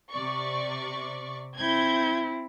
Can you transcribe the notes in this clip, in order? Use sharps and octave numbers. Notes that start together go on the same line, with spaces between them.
C3 D5 C#6
C4 E4 G6 G#6